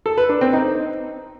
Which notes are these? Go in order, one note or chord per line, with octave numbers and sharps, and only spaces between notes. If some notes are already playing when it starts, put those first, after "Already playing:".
A4
B4
D4
C4
D#4